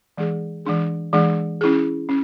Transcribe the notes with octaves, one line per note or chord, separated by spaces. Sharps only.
E3 G#3 D4 G#4
E3 G#3 D4 G#4
E3 G#3 D4 G#4
C#4 E4 G#4
C#4